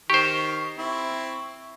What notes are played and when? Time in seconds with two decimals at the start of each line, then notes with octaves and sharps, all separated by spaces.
0.10 D#3 G4 C5 C#6
0.78 C4 E4